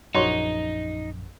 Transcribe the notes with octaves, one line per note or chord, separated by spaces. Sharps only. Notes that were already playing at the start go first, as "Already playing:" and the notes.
A#1 F#2 D#4 F#4 C#5 C6